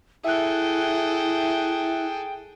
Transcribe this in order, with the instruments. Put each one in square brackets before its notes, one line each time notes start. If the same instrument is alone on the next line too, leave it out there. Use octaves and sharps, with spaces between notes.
[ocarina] E4 [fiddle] G#4 A4 [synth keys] E5 F#6 [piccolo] G5